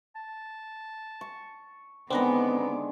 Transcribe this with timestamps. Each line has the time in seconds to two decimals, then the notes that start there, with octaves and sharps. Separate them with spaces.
0.16 A5
1.21 C#6
2.10 D3 D#3 G#3 B3 C4 B4 A#5 D6